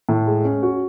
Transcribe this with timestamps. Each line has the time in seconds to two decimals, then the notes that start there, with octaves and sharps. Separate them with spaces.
0.09 A2
0.27 G#3
0.45 C#4
0.63 F#4